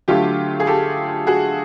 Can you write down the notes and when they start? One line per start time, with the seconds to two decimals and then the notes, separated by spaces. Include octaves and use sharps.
0.08 D3 F#3 A3 F4 G4
0.60 G#4
0.67 G4 A4
1.27 F#4 G#4